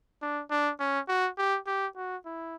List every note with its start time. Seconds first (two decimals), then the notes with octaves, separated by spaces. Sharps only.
0.22 D4
0.51 D4
0.80 C#4
1.09 F#4
1.38 G4
1.67 G4
1.96 F#4
2.26 E4